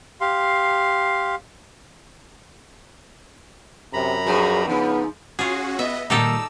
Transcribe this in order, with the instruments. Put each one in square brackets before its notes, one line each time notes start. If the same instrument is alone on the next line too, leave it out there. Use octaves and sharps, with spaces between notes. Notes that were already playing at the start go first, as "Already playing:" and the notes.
[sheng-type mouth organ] G4 F5 C6
[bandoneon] F#2 A#5 B5 [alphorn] C3
[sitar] G2 A#2 F3 [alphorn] F#3 [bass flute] G#4
[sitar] C#3 F3 [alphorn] B3 [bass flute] D#4
[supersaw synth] C#4 F#4 [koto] F4 G#4
[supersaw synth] B3 D#5 [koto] E5
[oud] A#2 D#3 G3 [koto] D#4 G4 A4 [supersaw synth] E6